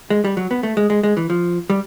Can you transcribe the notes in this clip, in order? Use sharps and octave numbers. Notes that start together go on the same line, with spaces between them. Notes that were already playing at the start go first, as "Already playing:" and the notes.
G#3
G3
F#3
B3
A3
G#3
G#3
G#3
E3
F3
G3